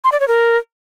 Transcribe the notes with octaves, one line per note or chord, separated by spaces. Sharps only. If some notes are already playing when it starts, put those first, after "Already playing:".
C6
D5
C#5
A#4